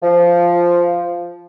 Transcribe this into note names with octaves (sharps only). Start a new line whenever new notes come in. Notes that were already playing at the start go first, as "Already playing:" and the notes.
F3